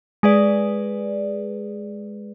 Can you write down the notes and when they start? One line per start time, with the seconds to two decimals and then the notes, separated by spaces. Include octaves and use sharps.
0.23 G#3 G#4 B4 D5